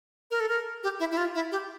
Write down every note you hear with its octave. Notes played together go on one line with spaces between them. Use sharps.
A#4
A4
A#4
G4
E4
E4
F4
E4
G4